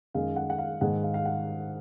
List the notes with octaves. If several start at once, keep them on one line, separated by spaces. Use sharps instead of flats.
F#2 D#3 G#3 F5
F#5
F#5
F5
G#2 D#3 G#3 F#5
F5
F5
F#5